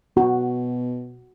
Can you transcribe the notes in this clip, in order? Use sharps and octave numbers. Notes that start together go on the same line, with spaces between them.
B2 F#4